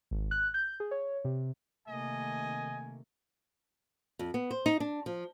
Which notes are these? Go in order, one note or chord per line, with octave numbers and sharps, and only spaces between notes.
G#1
F#6
G6
G#4
C#5
C3
C3 D#3 A3 A#3 D#5 G#5
F2
B3
C5
D#4
D4
F3